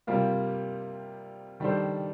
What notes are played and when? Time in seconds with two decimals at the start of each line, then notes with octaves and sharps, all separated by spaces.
0.07 C3 G3 A#3 F4
1.60 D#3 G3 D4 A4 C5